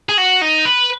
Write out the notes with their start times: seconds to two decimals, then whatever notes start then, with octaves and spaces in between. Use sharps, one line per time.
0.09 G#4
0.18 F#4
0.42 D#4
0.65 B4